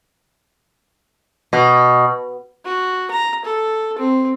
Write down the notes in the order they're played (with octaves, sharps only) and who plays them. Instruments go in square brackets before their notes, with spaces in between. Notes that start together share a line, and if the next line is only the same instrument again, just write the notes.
[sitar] B2
[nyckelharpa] F#4
A#5
A4
C4